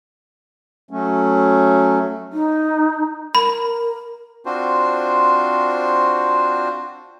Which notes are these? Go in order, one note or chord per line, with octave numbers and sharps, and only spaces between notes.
F#3 A3 C#4
D#4
A#4 B5
C4 D4 F4 F#4 C5